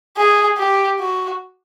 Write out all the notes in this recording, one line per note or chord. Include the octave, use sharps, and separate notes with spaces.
G#4
G4
F#4